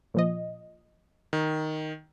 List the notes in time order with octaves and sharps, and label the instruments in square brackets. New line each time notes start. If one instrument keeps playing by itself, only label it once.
[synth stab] A#2 F3 D#5
[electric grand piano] D#3